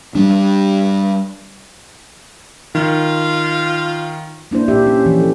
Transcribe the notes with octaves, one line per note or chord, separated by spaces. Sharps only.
G3 D4
D#3 F4
A#3 D4 E4 C5
A#2 G4 E5
C#4
E3 F3
A4